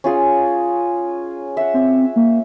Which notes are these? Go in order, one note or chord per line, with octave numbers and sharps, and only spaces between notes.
C#4 F4 G#4
E5 F#5
C4
A#3